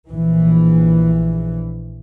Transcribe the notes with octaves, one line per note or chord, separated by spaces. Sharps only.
A#1 E3